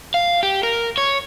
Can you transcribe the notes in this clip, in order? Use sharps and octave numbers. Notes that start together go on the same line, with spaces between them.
F5
G4
A#4
C#5